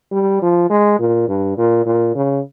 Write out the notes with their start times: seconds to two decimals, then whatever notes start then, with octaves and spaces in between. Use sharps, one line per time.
0.12 G3
0.42 F3
0.70 G#3
0.99 A#2
1.28 G2
1.57 A#2
1.86 A#2
2.15 C#3